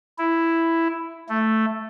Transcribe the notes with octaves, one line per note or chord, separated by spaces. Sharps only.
E4
A3